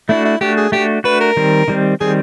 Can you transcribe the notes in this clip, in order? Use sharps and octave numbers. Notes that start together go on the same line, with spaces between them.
A3 D4 E4 F#4
E4
A3 D4 F#4 G4
G#4
A3 D4 F#4 G4
A3 D4 F#4 B4
A#4
D#3 G3 C4
D#3 G3 C4
D#3 G3 C4 G#4